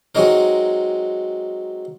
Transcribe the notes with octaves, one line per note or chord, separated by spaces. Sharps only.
F#3 G#3 C4 D#4 A#4